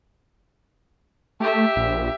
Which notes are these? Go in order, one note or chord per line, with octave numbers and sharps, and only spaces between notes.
A3 G4 E5
A#1